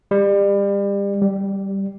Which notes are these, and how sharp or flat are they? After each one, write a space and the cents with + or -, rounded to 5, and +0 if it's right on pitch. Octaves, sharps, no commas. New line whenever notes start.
G3 +30
G3 -5